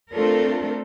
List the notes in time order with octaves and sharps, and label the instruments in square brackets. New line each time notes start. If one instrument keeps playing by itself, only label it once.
[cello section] A3 C4 D4 F4 A4 A#4